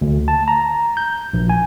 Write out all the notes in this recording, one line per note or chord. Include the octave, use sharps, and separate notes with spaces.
D2
A5
A#5
G6
A#1
G#5